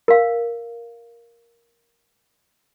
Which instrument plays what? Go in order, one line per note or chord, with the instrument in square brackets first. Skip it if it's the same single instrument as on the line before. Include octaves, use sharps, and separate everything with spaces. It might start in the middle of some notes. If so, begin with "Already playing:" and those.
[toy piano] A#4 F5